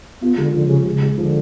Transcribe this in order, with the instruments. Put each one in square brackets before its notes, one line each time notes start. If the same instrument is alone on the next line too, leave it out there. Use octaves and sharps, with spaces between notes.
[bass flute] B3 [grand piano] F4
[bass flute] D3 [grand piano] G#3
[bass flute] D3 [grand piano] F3
[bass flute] C#3 [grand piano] G#3
[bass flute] C#3 [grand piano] G#3
[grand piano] G#3
[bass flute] C#3
[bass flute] D3 [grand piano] F3